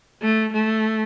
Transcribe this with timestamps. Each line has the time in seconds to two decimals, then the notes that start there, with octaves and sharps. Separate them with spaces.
0.22 A3
0.53 A3